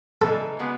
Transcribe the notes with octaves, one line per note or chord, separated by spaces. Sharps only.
C#3 E3 G#3 D#4 A4
C#3 G#3 B3 F#4 B4